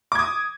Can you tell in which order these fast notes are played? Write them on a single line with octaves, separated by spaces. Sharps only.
D6 G#6 D#6